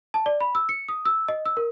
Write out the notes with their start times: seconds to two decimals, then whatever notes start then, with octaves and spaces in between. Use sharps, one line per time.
0.14 A5
0.26 D5
0.41 B5
0.55 E6
0.69 C#7
0.89 D#6
1.05 E6
1.28 D#5
1.46 E6
1.57 A#4